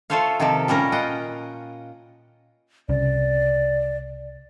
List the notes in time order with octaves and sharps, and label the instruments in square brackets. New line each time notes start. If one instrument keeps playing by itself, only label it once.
[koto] A3 F4 A4 C5 C#5 F5
C3 D#3 F3 G4 A4
A#2 G3 C#4 A#4
F4 D#5 F#5 G5
[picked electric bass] C2 C#3 [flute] D5